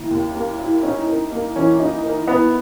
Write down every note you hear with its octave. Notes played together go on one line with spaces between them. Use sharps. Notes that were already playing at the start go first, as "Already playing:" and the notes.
Already playing: D#3 A#3 E4
D#2
A#3
E4
C#4 D#4
A#4
A#3
E3 C#4
D#4
A#4
B3 E4